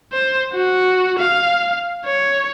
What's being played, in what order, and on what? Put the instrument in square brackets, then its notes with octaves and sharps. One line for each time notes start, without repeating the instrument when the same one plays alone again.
[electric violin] C5
F#4
F5
C#5